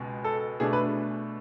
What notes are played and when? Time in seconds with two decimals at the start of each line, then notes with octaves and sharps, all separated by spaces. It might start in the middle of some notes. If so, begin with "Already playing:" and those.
Already playing: C#2 B2 G#3
0.24 A4
0.60 B2 A3 D4 G#4
0.73 B4